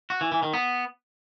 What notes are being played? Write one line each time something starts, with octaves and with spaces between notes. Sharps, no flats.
F#4
E3
E3
D#3
B3